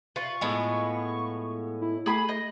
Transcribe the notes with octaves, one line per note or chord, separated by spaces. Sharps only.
F4 B4 C#6
A2 G#3 B3
E4
A3 G#4 B5 D#6
D#5